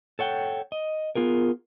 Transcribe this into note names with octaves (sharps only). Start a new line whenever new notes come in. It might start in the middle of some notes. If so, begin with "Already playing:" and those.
A4 C#5 F#5 G5
D#5
B3 F4 G#4 A#4